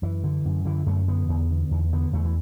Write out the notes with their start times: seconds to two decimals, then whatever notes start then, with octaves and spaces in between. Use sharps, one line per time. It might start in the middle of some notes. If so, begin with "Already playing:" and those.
0.02 F#2 E3
0.24 D3
0.45 F#2
0.65 D3 E3
0.86 F#2 A3
1.08 D3 B3
1.28 E2
1.50 D3
1.71 E2
1.93 D3 B3
2.13 E2 A3
2.25 E3